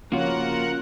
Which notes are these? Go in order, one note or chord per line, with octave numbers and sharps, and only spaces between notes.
C#3 F3 A#3 F4 F#4 A#4 C#5 F#5